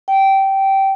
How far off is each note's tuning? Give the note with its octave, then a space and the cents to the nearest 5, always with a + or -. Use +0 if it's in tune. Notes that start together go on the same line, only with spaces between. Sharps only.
G5 -15